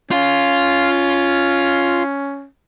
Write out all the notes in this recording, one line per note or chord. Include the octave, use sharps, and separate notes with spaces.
C#4 F4 F5